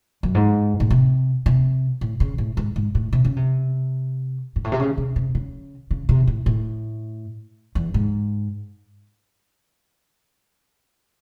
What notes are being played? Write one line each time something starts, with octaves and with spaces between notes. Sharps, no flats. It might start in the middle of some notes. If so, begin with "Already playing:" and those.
F#2
G#2
A2
C3
C3
A2
C#3
A2
G#2
G#2
A2
C3
C#3
C3
G#2
A2
C3
C#3
C3
C3
C#3
C#3
C3
A2
A2
E2
G#2